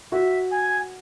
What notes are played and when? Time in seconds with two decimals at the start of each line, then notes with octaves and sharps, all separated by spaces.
0.12 F#4 E5
0.51 G#5